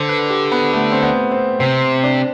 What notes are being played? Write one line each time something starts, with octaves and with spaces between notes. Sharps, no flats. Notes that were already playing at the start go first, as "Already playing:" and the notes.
Already playing: D3 C5
B4
G4
B3
A3
C4
B3
C4
C3 C4
D4